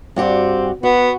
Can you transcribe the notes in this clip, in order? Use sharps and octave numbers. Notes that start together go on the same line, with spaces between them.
G2 C4 F#4 G4
B3 F#4